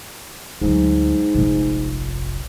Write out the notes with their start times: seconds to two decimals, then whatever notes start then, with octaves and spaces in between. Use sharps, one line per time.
0.61 D2 G#2 F#3
1.35 F1 A#1